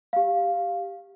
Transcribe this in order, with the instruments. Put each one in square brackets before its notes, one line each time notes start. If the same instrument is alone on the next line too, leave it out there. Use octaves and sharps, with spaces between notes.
[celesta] G4 F5